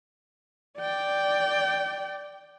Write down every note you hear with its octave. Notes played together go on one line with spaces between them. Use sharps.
D5 G5